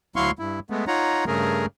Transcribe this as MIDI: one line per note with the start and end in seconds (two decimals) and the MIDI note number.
0.16 0.31 38
0.16 0.31 54
0.16 0.31 64
0.16 0.31 77
0.16 0.31 84
0.16 0.31 85
0.39 0.60 43
0.39 0.60 64
0.70 0.85 56
0.70 0.85 57
0.70 0.85 59
0.87 1.25 63
0.87 1.25 65
0.87 1.25 73
0.87 1.25 78
0.87 1.25 82
1.27 1.66 43
1.27 1.66 49
1.27 1.66 57
1.27 1.66 68
1.27 1.66 70